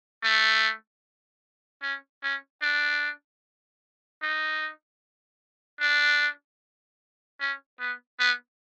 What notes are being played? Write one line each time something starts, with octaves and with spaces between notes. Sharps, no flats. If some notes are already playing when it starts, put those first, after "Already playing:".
A3
C#4
C#4
D4
D#4
D4
C#4
B3
B3